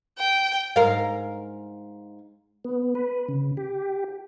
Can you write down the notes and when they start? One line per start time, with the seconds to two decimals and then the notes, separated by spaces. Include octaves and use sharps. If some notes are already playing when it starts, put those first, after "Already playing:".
0.19 G5
0.76 G#2 A#4 F5
2.65 B3
2.95 B4
3.28 C#3
3.57 G4